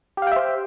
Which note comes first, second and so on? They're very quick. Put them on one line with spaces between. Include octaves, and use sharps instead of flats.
G4 F5 G5 E5 C5